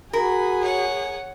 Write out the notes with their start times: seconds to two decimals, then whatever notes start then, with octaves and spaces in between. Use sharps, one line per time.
0.13 F#4 G#4 A#4 B5
0.61 C#5 F#5